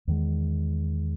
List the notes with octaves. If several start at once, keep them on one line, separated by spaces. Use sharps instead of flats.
E2 D#3 G#3